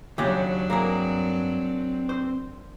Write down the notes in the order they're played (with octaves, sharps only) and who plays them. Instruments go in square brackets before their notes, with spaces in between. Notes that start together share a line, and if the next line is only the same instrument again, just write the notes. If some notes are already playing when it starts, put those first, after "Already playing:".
[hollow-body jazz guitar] D#2 C#3 [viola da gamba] F#3 D4 [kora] G4 G#4 F#5
[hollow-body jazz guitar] G2 A#4 [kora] A#3 G#4 [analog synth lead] C4
[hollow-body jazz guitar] C5